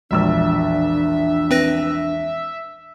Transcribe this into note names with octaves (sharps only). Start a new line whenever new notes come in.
E1 A#1 D4 E5 E6
C4 B4 A#6